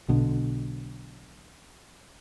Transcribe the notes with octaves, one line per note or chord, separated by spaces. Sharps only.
B1 B2 D3